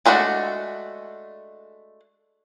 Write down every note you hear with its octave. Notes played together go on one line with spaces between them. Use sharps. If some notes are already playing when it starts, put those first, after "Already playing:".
G#3 A3 D4 F#4